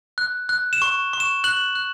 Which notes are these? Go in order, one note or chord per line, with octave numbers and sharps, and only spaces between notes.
F#6
F#6
E7
C#6
C#6
E7
F#6 F#7
F#6